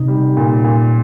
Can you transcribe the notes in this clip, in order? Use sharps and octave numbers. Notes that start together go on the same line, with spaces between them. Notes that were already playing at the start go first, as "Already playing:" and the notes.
Already playing: C3 D#4
G3
A#2
A#2